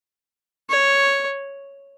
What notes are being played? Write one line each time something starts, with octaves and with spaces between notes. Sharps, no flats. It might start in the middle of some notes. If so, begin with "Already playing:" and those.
C#5